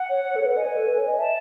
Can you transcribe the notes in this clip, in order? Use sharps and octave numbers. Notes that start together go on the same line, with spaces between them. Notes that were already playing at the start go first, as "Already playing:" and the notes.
Already playing: F#5
C#5
C#5
A4
C#5
B4
D#5 G#5
B4
A4
B4
C#5
D#5
E5 A5